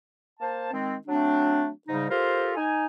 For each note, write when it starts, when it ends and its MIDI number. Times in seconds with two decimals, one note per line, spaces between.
0.40 0.71 58
0.40 0.71 72
0.40 0.71 81
0.72 0.95 51
0.72 0.95 56
0.72 0.95 60
1.07 1.69 54
1.07 1.69 57
1.07 1.69 60
1.07 1.69 62
1.88 2.10 44
1.88 2.10 49
1.88 2.10 55
1.88 2.10 63
2.10 2.52 65
2.10 2.52 67
2.10 2.52 69
2.10 2.52 70
2.10 2.52 72
2.56 2.86 63
2.56 2.86 80